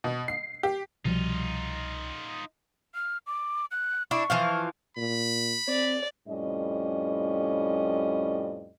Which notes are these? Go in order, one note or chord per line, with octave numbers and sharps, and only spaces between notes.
B2
C7
G4
C2 B2 F3 G3 D#4 F4
F6
D6
F#6
D4 E4 C#6
E3 F3 F5
A#2 B5
C4 D5
F2 A2 G3 C#4 D#5